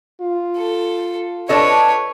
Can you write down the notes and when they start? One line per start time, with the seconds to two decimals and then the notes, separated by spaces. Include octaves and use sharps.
0.22 F4
0.58 A4
1.49 D4 A4 B4 C#5 D#5